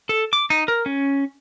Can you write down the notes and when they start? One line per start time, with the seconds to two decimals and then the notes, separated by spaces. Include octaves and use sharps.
0.09 A4
0.33 D6
0.50 D#4
0.68 A#4
0.86 C#4